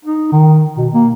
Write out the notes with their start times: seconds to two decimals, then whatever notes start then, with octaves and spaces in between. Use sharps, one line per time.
0.05 D#4
0.32 D#3
0.78 B2
0.94 A#3